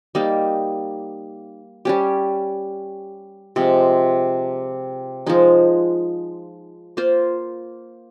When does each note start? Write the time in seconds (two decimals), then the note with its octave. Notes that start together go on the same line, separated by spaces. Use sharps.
0.15 G3 A#3 D#4
1.85 G3 C#4 G4
3.56 C3 F3 G#3
5.27 F3 G#3 D#4
6.97 A#3 F4 C5